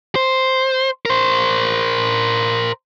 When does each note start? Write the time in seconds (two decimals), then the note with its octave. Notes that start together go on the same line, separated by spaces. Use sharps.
0.16 C5
1.06 A#4 C5